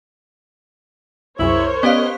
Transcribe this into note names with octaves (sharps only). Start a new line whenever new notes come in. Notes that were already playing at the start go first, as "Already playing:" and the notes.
C2 F#2 E4 G#4 A#4 C5 C#5
B3 C#4 G4 D5 D#5 F5